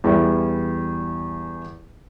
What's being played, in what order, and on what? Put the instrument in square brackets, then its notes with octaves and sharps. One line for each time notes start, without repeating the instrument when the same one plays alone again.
[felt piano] E2 E3 G3